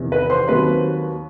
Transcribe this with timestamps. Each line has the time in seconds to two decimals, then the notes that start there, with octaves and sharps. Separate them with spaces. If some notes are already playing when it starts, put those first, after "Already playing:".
Already playing: E2 C3 D#3
0.12 B4 B5
0.30 C5 C6
0.48 D#2 D#3 F#3 C4 B4 B5